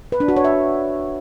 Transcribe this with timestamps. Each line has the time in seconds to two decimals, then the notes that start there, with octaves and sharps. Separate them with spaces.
0.12 B4
0.20 D4
0.28 F#4
0.36 C#5
0.44 E5